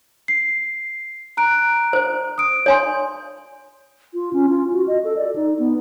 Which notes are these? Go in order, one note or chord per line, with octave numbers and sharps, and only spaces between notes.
C7
A#5 F#6 D7
C5
D#6 D7
C#5 G#5 C6
F4
C#4
F4
F#4
D#5
A4
D5
D#4
B3